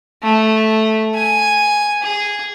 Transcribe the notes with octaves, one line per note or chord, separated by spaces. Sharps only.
A3
G#5
G#4